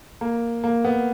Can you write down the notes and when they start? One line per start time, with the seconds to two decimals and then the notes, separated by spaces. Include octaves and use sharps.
0.21 A#3
0.64 A#3
0.85 B3